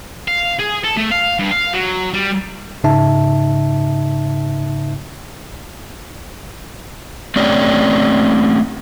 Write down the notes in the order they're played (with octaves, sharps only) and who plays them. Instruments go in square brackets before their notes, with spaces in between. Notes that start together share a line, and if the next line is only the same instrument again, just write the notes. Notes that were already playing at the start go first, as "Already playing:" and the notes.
[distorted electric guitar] F5
G#4
A4
A3
F5
G2
F5
F#3
G3
[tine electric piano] G#2 C#3 D#4 E5 A5
[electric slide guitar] A3 C4 C#4 G4 D5